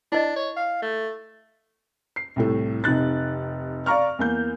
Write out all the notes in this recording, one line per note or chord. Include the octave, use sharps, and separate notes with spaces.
D4 E4 D#5
C#5
F5
A3
C7
C2 A2 A3
F1 C3 D#4 F#6 A6
D5 F5 A#5 C#6 F6
E2 A#3 G6